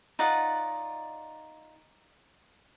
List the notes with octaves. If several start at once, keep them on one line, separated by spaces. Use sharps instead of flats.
D#4 F4 D5 F#5